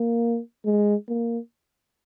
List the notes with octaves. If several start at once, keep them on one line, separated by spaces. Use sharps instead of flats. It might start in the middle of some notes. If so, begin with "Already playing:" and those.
Already playing: A#3
G#3
A#3